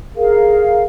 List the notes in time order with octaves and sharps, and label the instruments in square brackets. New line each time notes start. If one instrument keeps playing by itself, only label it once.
[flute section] G#4 A#4 F5